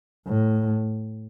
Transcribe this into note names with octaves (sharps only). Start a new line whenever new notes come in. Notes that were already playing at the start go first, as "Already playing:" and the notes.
A2